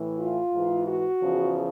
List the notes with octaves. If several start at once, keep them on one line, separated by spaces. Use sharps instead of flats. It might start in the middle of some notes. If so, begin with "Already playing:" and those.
Already playing: A2 E3
F4
G#2 E3
F#4
E2 C#3 F3